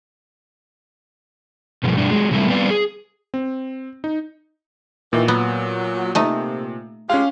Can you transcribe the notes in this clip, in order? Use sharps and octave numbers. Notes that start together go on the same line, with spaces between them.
G2 B2 F3 F#3 A3
G2 B2 G3 D4
F#3 G#3
C3 E3 G3 A3 A#3 E4
G3 B3 C4 B4 D5 F5
G#4
C4
D#4
A#2 D#3 E3
F#3 B3
C3 A3 D#4
G#3 C#4 F4 G4 F5